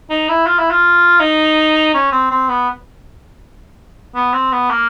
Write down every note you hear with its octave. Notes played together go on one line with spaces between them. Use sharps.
D#4
E4
F4
E4
F4
D#4
C#4
C4
C4
B3
B3
C4
B3
A#3